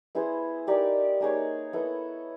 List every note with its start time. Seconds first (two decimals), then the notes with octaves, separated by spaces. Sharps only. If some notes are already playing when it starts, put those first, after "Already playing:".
0.15 B3 E4 G#4 C5
0.67 D#4 G4 A#4 D5
1.20 A#3 D#4 G#4 C#5
1.73 B3 E4 A4